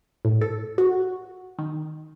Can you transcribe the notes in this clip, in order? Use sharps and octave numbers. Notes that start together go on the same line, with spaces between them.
A2
A4
F#4
D#3